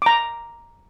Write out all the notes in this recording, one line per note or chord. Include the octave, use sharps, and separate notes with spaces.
A#5 D6